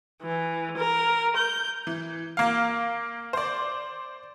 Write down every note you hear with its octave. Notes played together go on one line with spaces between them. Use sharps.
E3
A#4
G6
E3
A#3 F5
C5 D5